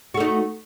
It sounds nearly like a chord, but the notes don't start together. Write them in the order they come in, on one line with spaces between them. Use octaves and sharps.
F#4 A3 D#4